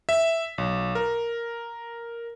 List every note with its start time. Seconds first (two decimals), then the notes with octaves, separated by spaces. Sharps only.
0.09 E5
0.58 B1
0.95 A#4